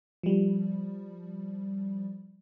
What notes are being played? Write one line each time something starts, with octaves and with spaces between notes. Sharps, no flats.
F3 G3